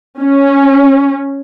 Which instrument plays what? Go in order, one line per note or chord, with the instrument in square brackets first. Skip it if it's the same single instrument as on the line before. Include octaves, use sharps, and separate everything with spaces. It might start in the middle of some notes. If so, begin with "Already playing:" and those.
[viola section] C#4